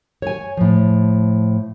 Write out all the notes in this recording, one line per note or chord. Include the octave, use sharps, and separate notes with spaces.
C#5 G#5
A2 F3